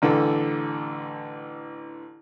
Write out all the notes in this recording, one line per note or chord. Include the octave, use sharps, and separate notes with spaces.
A1 D3 E3 A4